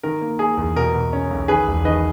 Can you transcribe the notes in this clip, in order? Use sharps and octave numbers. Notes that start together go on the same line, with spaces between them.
D#3 A#4
A#3
A#3 G#4
E2
B2 A#4
B2
C#4
B1
D#3 G#4 B4
E1
D#3 B4 D#5